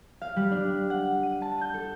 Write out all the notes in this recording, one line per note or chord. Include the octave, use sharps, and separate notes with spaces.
F5
G3
D4
F#5
D#7
A5
G6
A4